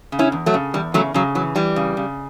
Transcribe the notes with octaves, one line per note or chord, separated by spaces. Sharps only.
C#3
C#4 E4
E2
F#3 A3
C#3
E2 G3
C#3 F#3 A3
C#3 F#3
E3 F#3
E3 G3
C#3
C#3